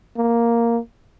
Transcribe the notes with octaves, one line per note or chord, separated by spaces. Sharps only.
A#3